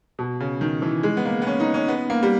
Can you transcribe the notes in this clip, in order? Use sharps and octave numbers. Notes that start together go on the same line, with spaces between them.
B2
C#3
D#3
E3
G#3
B3
A#3
B3
C#4
D#4
C#4
B3
A#3
G3